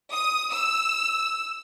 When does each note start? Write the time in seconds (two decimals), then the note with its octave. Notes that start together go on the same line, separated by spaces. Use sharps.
0.11 D#6
0.53 E6